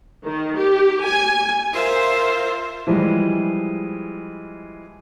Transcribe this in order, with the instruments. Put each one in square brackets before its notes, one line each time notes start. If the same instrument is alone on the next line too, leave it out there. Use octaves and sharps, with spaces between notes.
[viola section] D#3
G4
G#5
[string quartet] F4 A#4 C5 E5
[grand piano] E3 F3 G3 G#3